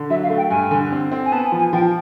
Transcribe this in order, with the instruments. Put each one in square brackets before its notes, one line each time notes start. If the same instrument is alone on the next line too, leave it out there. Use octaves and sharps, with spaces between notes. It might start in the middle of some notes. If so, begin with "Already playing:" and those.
Already playing: [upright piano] D3
[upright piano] F#3 [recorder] E5
[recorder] F5
[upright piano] A3
[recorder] G5
[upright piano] G2 [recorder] G#5
[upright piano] D3
C4
C4
[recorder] G#5
[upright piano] B3 [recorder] A5
[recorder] G#5
[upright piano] F3
[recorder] G#5
[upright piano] F3 [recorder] G5